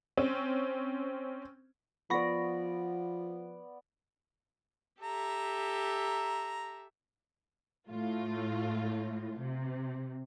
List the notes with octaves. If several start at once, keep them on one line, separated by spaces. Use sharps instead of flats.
C4 C#4
F3 B3 D5 B5 C#6 A#6
G4 A4 E5 A#5
A2 A3 F4
C3